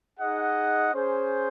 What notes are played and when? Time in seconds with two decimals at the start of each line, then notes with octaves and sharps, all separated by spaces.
0.18 D#4 G#4 D#5 F#5
0.92 C#4 G#4 C5